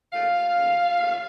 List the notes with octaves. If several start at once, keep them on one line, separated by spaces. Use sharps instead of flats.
D#2 C#3 A3 C#4 F4 F5
D#2 C#3 A3 C#4
D#2 C#3 A3 C#4